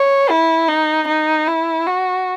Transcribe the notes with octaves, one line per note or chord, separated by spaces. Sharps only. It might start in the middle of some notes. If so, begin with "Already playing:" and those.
Already playing: C#5
E4
D#4
D#4
E4
F#4